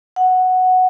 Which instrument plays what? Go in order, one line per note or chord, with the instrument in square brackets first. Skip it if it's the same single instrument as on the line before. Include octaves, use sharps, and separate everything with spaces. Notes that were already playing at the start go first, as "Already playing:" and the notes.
[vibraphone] F#5